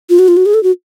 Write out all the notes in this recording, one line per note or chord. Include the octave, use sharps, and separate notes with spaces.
F4
F#4
F4
F#4
G#4
A4
F#4